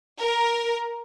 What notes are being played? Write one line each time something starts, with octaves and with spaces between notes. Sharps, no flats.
A#4